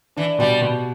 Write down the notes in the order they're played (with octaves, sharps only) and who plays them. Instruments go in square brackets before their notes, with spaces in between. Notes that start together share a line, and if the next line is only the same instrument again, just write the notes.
[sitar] E3 [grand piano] D4
[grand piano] B2 [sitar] G3
[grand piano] B2